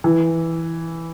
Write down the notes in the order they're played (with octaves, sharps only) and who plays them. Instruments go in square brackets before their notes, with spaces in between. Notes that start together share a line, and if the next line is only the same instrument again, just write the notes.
[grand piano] E3